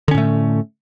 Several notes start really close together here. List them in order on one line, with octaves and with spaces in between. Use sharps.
D3 C#4 A2 A3